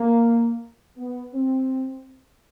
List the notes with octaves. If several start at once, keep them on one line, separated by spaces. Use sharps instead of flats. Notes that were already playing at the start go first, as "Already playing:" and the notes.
Already playing: A#3
B3
C4